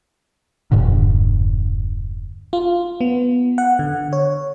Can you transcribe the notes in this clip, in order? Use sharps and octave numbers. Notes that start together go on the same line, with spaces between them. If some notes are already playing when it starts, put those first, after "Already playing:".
E1 G2 A#2 D3
F4
B3
F#5
D3
C#5